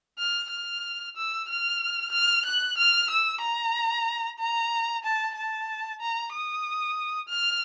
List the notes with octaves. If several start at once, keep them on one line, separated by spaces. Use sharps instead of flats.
F6
F6
E6
F6
F6
F#6
F6
E6
A#5
A#5
A5
A5
A#5
D#6
F6